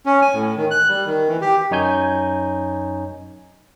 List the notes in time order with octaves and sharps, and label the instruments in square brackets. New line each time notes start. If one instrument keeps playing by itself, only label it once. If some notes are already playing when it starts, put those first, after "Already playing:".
[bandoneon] C#4
G#5
A2
D#3
F#6
G3
D#3
E3
G4
[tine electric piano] F#2 D#4 C#5 G#5 G6